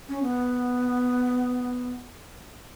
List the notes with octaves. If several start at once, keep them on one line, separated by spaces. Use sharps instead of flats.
C#4
B3